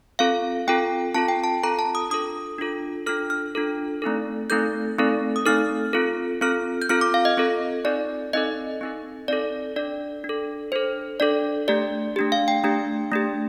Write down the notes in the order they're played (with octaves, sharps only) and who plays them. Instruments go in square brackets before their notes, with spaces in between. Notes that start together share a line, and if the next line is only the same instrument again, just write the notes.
[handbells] C4 F4 A4 F5
C4 F4 A4 G5
C4 F4 A4 A5
G5
A5
C4 F4 A4 A#5
A5
D#6
D4 F4 A4 D#6
D4 F4 A4
D4 F4 A4 F6
F6
D4 F4 A4
A3 C4 D#4 A4
A3 C4 D#4 A4 G6
A3 C4 D#4 A4
D#6
A3 C4 D#4 A4 F6
C4 F4 A4
C4 F4 A4 F6
G6
C4 F4 A4 F6
D6
F5
D#5
C4 F4 A4
C4 D#4 A4 D5
C4 D#4 A4 D#5
C4 D#4 A4
C4 D#4 A4 D5
D4 A4 D5
D4
A4
D4 A4 C5
D4 A4 D5
A3 D4 G4 D5
A3 D4 G4
F5
G5
A3 D4 G4
A3 D4 G4